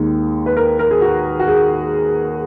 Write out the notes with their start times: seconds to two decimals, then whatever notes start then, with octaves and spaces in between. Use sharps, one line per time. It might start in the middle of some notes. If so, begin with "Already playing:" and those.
Already playing: D#2 D#3 G#3
0.46 B4
0.57 A#4
0.79 A#4
0.91 G#4
1.02 F#4
1.39 F#4
1.48 G#4